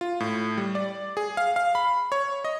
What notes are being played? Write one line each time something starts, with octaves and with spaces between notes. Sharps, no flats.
F4
A2
G3
D5
G#4
F5
F5
B5
C#5
D#5